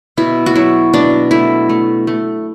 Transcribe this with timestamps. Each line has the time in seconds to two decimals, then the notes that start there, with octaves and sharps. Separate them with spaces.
0.17 B2 E4
0.46 F#4
0.55 F#3 E4
0.93 B2 D4
1.31 A3 E4
1.69 A3
2.07 A3